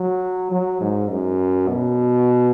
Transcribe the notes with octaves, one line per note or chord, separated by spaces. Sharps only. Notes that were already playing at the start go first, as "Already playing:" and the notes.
Already playing: F#3
F#3
G#2
F#2
B2